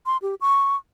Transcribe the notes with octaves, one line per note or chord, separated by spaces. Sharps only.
C6
G4
C#6